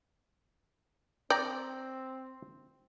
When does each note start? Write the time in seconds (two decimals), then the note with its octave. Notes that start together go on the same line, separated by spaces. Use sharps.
1.30 C4 D5 G5 A#5